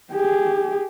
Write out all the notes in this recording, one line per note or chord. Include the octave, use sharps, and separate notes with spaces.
G4 G#4